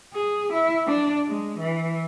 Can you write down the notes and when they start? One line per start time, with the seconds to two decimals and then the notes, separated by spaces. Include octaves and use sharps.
0.14 G#4
0.53 E4
0.87 D4
1.27 G#3
1.59 E3